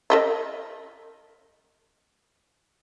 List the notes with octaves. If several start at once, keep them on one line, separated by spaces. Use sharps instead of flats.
A#4 D#5 E5